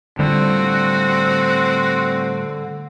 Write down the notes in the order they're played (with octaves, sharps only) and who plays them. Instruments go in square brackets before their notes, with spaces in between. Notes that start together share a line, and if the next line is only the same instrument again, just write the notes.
[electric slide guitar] A2 G3 F4 [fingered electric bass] D3 [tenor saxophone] C4 [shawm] F#4